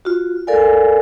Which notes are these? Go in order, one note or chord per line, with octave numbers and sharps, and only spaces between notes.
F4 F#4
A4 A#4 D5 F5 G#5